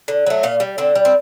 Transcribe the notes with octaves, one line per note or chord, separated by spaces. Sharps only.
D3
F#3 A3
A#2 F4
G3
D3 C4
G3
C4